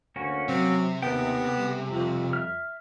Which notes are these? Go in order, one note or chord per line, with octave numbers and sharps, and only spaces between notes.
D2 A#3 C#4 F#4
C3 F#3 C4
D#2 B3 G#4 A4 G5
G3
F2
E5 F6